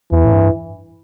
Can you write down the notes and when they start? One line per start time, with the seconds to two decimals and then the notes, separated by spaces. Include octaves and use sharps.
0.11 E2 E3
0.25 A2
0.33 G2